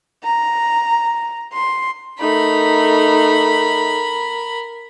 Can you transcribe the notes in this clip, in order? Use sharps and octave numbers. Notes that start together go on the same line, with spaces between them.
A#5
C6
A3 D#4 A#4 B5